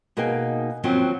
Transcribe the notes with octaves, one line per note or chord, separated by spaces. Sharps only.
B2 A#3 D#4 G#4 G5
D#2 F3 F#3 C4 C#4